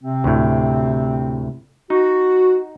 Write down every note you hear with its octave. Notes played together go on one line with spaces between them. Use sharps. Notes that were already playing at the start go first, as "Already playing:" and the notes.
C3 C4
D2 A2
D#4 F#4